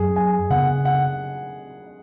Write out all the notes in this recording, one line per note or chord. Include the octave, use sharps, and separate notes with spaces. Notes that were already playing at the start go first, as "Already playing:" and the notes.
Already playing: F#2 F#3 C#4 G#4
G#5
C#3 B3 F#5
F#5